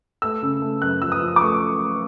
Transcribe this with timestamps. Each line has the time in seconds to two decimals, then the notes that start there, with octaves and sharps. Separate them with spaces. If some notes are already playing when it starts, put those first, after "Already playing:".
0.22 A3 E6
0.42 C#3
0.62 A3
0.82 F#2 F#6
1.02 F3 E6
1.12 D#6
1.22 F3
1.36 D6
1.41 A3 C#6